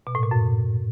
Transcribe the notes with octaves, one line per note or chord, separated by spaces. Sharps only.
B2
A2
A#2
F#2